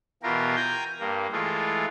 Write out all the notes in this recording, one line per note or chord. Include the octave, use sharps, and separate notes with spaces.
B2 E3 F4 G4 A#4
G5 G#5 A#5 G6
G2 A#3
E3 G#3 A3 F4